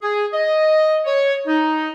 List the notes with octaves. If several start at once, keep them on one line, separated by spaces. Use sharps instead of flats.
G#4
D#5
C#5
D#4